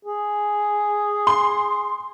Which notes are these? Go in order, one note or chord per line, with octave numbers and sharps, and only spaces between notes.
G#4
C6